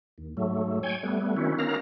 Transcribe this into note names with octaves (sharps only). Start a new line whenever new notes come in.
D#2
G#2 F#3 A3
C#5 G5 G#5
G3 A3 B3
D#3 C4 C#4 E4 F#4
B3 C#4 D#4 A#4 F5 A#5